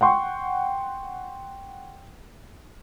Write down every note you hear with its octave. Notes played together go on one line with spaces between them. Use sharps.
F#5 G5 C6 C#6